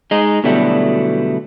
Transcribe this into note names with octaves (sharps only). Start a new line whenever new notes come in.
G#3 D#4
B2 D3 F#3 G3 A3 E4